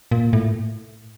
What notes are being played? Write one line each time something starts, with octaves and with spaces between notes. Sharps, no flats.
A#2
A2